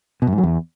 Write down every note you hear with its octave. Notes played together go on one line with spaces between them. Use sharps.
B2
F#2
G#2
F#3
E2